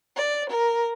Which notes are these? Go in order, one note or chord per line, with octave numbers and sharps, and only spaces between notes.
D5
A#4